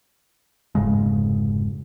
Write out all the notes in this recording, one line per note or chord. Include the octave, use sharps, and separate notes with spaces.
F1 G#2 C#3 G#3